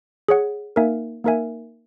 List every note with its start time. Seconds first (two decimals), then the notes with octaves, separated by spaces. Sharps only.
0.29 G#4 C#5 F#5
0.76 A#3 D#4 A#4 E5 G#5
1.24 A#3 D#4 A#4 E5 G#5